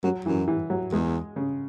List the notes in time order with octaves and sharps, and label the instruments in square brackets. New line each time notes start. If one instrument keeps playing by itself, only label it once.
[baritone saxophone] F#2 [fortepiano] F#3
[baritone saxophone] F#2 [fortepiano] E3
[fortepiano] E3
F#3
[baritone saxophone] E2 [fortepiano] G#3
[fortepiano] C#3